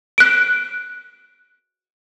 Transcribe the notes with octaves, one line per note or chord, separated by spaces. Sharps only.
F#6 D7